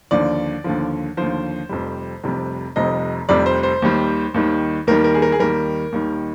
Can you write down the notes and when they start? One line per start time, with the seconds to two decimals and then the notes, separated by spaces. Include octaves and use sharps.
0.11 D#2 D3 F3 D5
0.64 D#2 D3 F3
1.17 D#2 D3 F3 C5
1.69 F1 F2 C3 G3
2.23 F1 F2 C3 G3
2.76 F1 F2 C3 G3 D#5
3.29 F1 F2 C3 G3 D5
3.46 C5
3.63 C5
3.82 D#2 D#3 G3
4.34 D#2 D#3 G3
4.87 D#2 D#3 G3 A#4
5.04 A#4
5.14 G#4
5.22 A#4
5.32 G#4
5.39 D#2 D#3 G3 A#4
5.92 D#2 D#3 G3